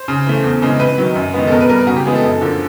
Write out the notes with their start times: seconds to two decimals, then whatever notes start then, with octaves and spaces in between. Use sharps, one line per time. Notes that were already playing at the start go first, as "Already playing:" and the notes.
Already playing: C5
0.08 C#3
0.26 E3 A3
0.44 E2
0.62 C#3 E3 G#3
0.80 C3 B4
0.98 D#3 F#3
1.16 F#2
1.34 D#3 G#3 B3
1.47 A4
1.51 B2 A#4
1.61 B4
1.69 G3 A#3 A#4
1.87 C#3 F#4
1.96 G4
2.06 E3 G#3 B3 G#4
2.15 A4
2.23 F#2
2.41 D3 F3 A#3